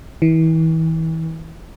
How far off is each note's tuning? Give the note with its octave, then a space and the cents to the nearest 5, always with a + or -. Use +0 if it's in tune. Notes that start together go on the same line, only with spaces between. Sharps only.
E3 -35